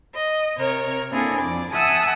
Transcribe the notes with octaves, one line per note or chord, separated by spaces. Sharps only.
D#5
C3 A#4 C#5
A#3 C4 D4 E4 G#4 A4
F2 D5 D6
E5 F#5 G#5 A5 D#6 E6